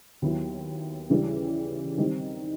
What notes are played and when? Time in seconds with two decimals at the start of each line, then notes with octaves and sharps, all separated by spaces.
0.22 D#2 D#3 F#3 B3 E4
1.10 C#3 E3 G3
1.98 D#3 G3 C4 D#4